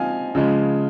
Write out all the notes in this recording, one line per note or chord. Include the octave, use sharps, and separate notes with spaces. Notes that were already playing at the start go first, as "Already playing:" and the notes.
Already playing: F3 C4 D#4 F5 G#5
C#3 F3 G#3